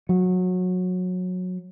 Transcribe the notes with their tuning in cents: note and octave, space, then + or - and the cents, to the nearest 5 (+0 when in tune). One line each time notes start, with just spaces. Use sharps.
F#3 -20